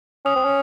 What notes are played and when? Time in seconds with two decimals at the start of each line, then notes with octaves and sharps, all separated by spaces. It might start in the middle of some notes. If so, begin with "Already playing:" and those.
0.25 C#4 D#6
0.35 C4
0.45 C#4